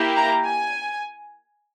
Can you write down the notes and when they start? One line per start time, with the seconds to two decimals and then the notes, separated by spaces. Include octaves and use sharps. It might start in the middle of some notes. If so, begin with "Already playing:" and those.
Already playing: A#3 E4 G4
0.17 A#5
0.45 G#5